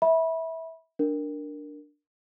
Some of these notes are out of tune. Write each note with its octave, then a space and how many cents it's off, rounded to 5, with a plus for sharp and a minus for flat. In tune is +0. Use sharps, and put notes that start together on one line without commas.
E5 -20 B5 -20
D4 +0 A#4 +0